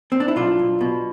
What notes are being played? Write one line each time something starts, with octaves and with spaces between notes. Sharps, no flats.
C4
D4
E4
B1 D4 F4
B1
B2